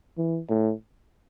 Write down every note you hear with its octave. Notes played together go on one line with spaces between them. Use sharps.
E3
A2